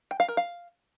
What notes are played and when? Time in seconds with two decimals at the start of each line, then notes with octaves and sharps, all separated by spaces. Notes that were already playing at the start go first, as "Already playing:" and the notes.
0.11 G5
0.20 F5
0.28 A#4
0.37 F5